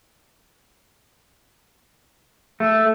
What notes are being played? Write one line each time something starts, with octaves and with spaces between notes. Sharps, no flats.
A3